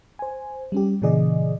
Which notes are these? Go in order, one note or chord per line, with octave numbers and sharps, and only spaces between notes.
C5 G#5
G3 C#4 G4
A#2 C#3 E3 G#4 D5 D#5